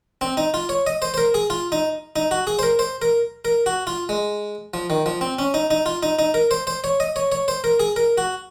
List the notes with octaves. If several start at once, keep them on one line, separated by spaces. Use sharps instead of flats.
C4
D#4
F4
C#5
D#5
C5
C5
A#4
G#4
F4
D#4
D#4
F#4
G#4
C5
A#4
C5
A#4
A#4
F#4
F4
G#3
F3
D#3
F3
C4
C#4
D#4
D#4
F4
D#4
D#4
A#4
C5
C5
C#5
D#5
C#5
C#5
C5
A#4
G#4
A#4
F#4